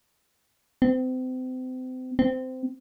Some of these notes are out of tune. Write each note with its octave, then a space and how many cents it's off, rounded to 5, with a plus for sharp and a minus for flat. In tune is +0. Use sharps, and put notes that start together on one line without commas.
C4 -35
C4 -20